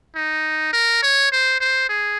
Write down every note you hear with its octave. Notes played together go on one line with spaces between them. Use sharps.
D#4
A#4
C#5
C5
C5
G#4